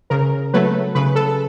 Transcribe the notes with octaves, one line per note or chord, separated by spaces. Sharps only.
C#3 A#4
F#3 A3 B4
C#3 B4
A4